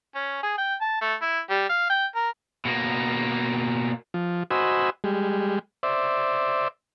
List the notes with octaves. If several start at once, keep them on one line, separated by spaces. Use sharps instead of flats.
C#4
G#4
G5
A5
A3
E4
G3
F5
G5
A#4
B2 A#3
F3
F#4 C5 D#5 G#5 B5 E6
G3 G#3
C5 D5 E5